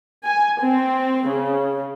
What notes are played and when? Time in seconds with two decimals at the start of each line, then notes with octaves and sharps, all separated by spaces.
0.24 G#5
0.61 C4
1.28 C#3